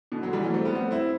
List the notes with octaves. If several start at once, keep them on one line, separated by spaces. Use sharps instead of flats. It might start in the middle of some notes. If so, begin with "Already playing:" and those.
B2 D3
D3 F#3
E3 G3
F#3 A3
A3 C4
G3 B3
A3 C4
C4 E4